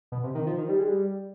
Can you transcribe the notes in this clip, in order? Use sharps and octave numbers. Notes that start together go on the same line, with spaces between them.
B2
C3
D#3
F3
D#3
G3
G#3
G3